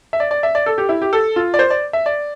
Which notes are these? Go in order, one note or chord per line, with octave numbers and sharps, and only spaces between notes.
E5
D5
D5
E5
D5
A4
G4
E4
G4
A4
F4
D5
C5
D5
E5
D5